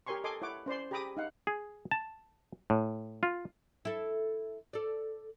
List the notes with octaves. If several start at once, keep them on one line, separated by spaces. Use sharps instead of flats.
G4 A#4 C#5 G#5 C6 C#6
A4 D#5 G#5 C6 D6
E4 C#5 F#5 D6
C#4 C5 D5 C6
G4 G#4 A#5 B5 D6 D#6
D#4 F5 F#5
G#4
A5
A2
F4
E4 A4
A4 D5